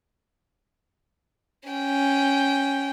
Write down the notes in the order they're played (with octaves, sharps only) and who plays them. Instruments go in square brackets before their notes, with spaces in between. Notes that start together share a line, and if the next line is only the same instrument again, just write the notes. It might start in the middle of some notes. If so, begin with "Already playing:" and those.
[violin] C#4 G5